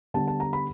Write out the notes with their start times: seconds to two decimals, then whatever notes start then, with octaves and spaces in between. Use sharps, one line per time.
0.14 D3 G3 B3 A5
0.27 A5
0.40 A#5
0.53 B5